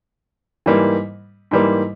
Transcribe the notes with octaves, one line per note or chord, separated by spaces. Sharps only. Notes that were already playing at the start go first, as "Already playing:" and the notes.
G#2 E3 G3 A#3
G#2 E3 G3 A#3